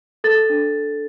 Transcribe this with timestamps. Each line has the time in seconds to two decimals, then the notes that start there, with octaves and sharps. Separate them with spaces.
0.24 A4 A6
0.50 D4